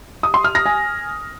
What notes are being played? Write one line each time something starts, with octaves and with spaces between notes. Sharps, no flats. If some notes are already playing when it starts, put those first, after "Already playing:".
D#6
C6
F6
A#6
G#5